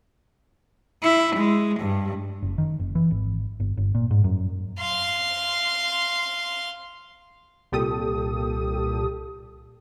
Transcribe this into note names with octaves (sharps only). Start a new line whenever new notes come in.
E4
G#3
G2
F#1
D#3
F#1
E3
G#1
G1
G1
A#2
G#2
F#2
F5 C6
C2 A#2 G4 A4 D#6